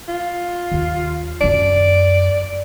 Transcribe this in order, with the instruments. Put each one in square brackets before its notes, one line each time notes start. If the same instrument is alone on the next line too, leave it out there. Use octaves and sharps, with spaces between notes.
[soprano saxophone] F4
[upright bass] D#2
[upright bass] F#2 D#4 [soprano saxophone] D5